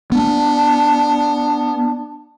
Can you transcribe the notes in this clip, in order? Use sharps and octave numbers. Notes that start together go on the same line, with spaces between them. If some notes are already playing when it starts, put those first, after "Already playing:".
B3 D4